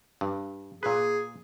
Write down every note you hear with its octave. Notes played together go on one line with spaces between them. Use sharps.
G2
A#2 G#4 B4